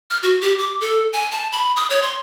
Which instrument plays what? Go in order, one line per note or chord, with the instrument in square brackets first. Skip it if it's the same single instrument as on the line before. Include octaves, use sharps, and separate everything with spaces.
[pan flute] F6
F#4
G4
D6
A4
G#5
A5
B5
D#6
C#5
C6